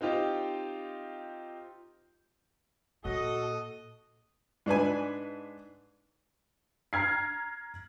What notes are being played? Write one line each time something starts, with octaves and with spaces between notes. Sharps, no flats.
C4 D#4 F4 G4
A#2 F#4 A4 D#5
G#2 D4 B4 G#5
A#5 F6 G#6 C7